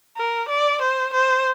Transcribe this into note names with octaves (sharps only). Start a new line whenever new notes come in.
A#4
D5
C5
C5